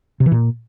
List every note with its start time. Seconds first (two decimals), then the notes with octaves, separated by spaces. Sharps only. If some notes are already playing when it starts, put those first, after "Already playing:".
0.20 C3
0.26 E3
0.32 A#2